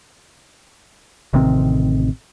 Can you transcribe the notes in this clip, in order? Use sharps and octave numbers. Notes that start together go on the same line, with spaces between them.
A1 C3 D#3 C4